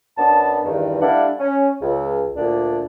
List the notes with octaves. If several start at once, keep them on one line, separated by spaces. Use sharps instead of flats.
F#2 B3 D4 A5
E2 G2 D#3
G3 A3 D4 E4 F5 F#5
C#4
C#2
D2 A#2 D4